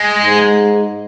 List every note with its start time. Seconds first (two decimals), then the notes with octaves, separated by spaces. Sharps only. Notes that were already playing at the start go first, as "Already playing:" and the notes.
Already playing: G#3
0.22 G#2